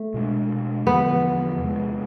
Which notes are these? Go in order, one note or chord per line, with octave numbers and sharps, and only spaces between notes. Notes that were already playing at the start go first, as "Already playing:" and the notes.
Already playing: A3
B2 G#3 D4
E2 D3 F3 B3
E2 C3 G#3